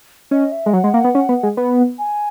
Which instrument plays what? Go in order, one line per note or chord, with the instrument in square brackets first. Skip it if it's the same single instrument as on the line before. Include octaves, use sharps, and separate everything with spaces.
[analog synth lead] C#4 [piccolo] D#5
[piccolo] E5
[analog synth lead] G#3
[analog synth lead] F#3 [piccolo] F#5
[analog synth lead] G#3
A#3
B3
C#4
B3
G#3
B3
[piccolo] G#5